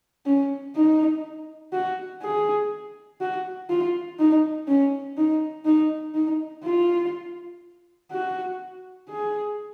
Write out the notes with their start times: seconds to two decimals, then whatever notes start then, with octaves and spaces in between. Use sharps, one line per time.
0.26 C#4
0.76 D#4
1.73 F#4
2.22 G#4
3.21 F#4
3.69 F4
4.19 D#4
4.68 C#4
5.18 D#4
5.65 D#4
6.15 D#4
6.64 F4
8.11 F#4
9.09 G#4